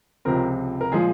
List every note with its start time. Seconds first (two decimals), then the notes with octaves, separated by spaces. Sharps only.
0.25 C#2 C3 F3 C4 A#4
0.81 A#4
0.92 A#2 F3 G#3 G#4